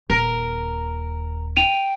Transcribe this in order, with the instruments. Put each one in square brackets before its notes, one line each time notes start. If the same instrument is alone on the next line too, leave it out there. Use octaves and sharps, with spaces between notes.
[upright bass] D#1 [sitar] A#4
[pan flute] G5 [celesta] D#7 F7